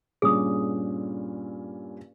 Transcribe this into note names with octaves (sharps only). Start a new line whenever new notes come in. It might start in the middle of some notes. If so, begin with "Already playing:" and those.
G2 A#2 C#4 G#4 D#6